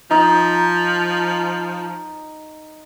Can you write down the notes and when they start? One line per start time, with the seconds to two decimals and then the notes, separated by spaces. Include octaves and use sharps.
0.11 F3 D#4